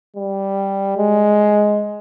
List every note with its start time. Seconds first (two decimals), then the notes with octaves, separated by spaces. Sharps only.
0.17 G3
0.98 G#3